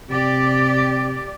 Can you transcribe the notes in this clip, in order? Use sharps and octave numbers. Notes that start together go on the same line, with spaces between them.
C3 G4 D5